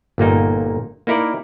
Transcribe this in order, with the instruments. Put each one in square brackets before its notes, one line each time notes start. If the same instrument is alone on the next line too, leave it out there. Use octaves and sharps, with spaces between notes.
[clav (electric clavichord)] G1 A#2 A#3 D#4
A#3 D#4 E4 A#4 D5